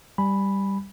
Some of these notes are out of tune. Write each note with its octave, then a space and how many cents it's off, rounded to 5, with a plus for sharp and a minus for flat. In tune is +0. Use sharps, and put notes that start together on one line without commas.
G3 +0 G#5 +0 B5 +0